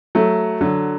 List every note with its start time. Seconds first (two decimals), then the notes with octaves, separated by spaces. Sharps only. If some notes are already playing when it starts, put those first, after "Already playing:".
0.15 F#3 A3
0.61 D3 F#3